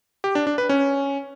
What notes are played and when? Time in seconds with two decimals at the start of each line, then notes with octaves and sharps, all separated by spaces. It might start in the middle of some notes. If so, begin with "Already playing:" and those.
0.24 G4
0.35 D4
0.47 D4
0.58 B4
0.69 C#4